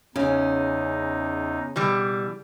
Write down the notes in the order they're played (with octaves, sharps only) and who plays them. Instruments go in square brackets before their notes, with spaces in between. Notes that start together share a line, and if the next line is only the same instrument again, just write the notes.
[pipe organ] E2 D#4 [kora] C#3 [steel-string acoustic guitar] C#4
[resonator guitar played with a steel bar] B2 E3 G3